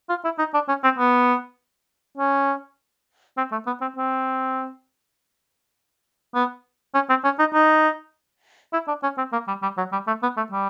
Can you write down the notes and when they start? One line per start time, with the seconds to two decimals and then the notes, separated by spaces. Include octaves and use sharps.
0.09 F4
0.24 E4
0.39 D#4
0.54 D4
0.68 C#4
0.84 C4
0.99 B3
2.17 C#4
3.37 C4
3.52 A3
3.67 B3
3.81 C4
3.96 C4
6.35 B3
6.94 C#4
7.10 C4
7.24 C#4
7.39 D#4
7.53 D#4
8.73 E4
8.88 D4
9.03 C#4
9.18 C4
9.33 A#3
9.48 G3
9.63 G3
9.78 F#3
9.92 G3
10.07 A3
10.23 B3
10.37 A3
10.52 G3